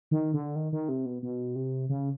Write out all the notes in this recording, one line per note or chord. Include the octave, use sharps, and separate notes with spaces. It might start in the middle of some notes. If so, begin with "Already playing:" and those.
D#3
D3
D#3
D#3
C3
B2
B2
C3
C#3